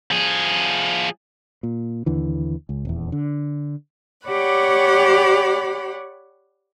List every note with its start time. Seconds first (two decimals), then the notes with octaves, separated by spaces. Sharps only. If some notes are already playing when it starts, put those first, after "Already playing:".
0.11 F3 G#4
1.63 A#2
2.06 D#2 D3 E3
2.69 C#2
2.85 D#1 E2
3.12 D3
4.26 G4 C#5 D5 F#5 B5